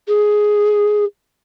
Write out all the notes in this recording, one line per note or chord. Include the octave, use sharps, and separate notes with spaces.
G#4